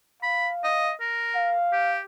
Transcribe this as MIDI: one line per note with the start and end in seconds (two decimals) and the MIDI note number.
0.23 0.92 77
0.23 0.49 83
0.64 0.92 75
1.01 1.55 70
1.35 1.97 77
1.73 2.02 67